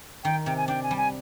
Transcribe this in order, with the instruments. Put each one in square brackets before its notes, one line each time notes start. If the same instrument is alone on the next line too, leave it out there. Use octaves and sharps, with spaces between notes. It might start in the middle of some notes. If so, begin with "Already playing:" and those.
[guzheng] D#3 [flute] G5
[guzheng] C3 [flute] G5
[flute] G#5
[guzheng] D4 [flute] G5
[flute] G#5
[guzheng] G3
[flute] G#5